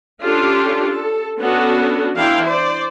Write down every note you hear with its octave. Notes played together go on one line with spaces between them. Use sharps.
C#4 D4 F4 G4 A4
A4
B3 C#4 D4 F#4 A4
E3 D4 E4 F5 G5 C6
C5 D5